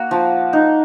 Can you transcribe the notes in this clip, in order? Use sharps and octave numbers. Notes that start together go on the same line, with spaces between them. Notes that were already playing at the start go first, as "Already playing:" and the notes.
Already playing: A#3 F#4
F3
D#4